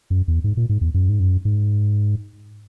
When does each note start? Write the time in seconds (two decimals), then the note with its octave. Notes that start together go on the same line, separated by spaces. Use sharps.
0.10 F#2
0.28 E2
0.44 G#2
0.57 A#2
0.69 G#2
0.81 E2
0.94 F#2
1.09 G#2
1.20 F#2
1.45 G#2